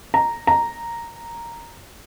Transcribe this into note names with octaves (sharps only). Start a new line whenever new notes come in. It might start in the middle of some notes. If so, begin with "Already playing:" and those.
A#5
A#5